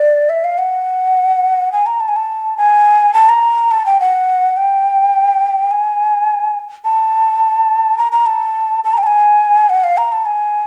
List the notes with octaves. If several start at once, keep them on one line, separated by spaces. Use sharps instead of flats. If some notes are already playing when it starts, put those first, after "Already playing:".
Already playing: D5
E5
F5
F#5
G#5
A#5
A5
G#5
A5
G#5
A5
A#5
A5
G5
F#5
G5
G#5
A5
A#5
A#5
A5
A5
A#5
G5
A5
G#5
F#5
F5
A#5
A5
G#5